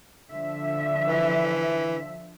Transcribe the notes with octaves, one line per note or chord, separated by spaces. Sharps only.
D3 F3 E5
E3